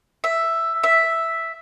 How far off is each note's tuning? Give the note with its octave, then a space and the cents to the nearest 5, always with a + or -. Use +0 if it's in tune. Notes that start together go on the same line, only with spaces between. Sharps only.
E5 +5
E5 +0